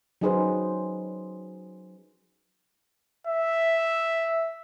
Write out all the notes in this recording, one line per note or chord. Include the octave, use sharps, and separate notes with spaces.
F#3 C#4 D#4 G#4 B4 C5
E5